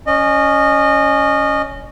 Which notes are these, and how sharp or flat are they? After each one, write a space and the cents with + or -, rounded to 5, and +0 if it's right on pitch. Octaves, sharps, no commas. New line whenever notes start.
C#4 +10 D#5 -25